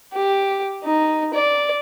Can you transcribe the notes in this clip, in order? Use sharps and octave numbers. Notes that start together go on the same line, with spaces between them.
G4
D#4
D5